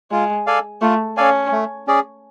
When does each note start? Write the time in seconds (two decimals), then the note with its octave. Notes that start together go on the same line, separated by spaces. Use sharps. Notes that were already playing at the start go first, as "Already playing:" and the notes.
0.12 G#3 F4
0.47 A4 D5 F5 G#5
0.81 A3 F4
1.17 C#4 A4 D5 F5 G#5
1.52 A3
1.87 C#4 G#4 D5